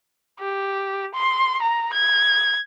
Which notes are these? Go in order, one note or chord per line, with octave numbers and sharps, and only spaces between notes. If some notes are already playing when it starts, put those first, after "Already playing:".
G4
C6
A#5
G#6